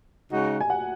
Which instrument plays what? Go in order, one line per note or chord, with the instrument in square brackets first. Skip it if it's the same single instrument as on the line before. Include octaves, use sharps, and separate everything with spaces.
[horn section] C#3 G#3 D#4 F#4
[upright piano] G#5
F#5